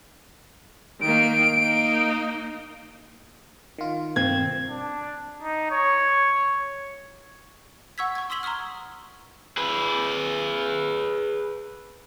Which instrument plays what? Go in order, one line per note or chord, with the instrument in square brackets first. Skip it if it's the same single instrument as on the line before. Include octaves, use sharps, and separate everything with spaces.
[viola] D#3 A#3 [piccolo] D7
[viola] A#3 D#4
[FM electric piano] D#3 F4
[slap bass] G2 B2 [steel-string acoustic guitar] C4 [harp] G#6
[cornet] D4
D#4
C#5
[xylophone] F#5 C#6 E6 G#6 B6
C#6 G#6
C6 D#6 E6 B6 F#7 G7
A#5 C6 C#6 D#6 F6
[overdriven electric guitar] G#4 B4